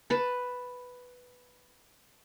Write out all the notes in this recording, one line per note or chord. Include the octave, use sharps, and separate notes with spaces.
B4 A5